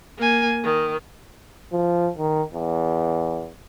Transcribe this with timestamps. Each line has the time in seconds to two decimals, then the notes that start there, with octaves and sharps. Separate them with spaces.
0.18 A#3 G#5
0.64 D#3
1.73 F3
2.18 D#3
2.54 E2